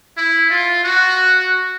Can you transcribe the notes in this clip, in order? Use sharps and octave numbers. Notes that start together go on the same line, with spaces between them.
E4
F4
F#4